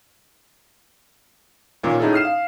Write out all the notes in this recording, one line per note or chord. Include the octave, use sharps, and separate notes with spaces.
A#2 D#3 A#3 C#4 F4
A2 C#4 D#4 E4 G#4 A4
D#6 F6 C7 E7
F5